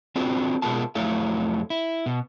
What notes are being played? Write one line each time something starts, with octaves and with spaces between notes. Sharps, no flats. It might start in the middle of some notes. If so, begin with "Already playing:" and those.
C4 D4 F4 F#4 A4
B2 G#3 A#3 B3 F4 A5
F2 F#3 A3 E4 A4 F5
E4
B2